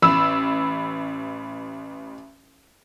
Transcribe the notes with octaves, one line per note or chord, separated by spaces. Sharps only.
A1 B5 E6